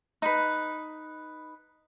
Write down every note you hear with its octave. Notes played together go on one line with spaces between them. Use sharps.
D#4 B4